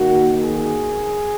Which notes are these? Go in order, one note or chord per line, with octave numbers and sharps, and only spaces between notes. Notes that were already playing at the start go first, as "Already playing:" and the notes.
Already playing: D#3 A#3 F#4
G#4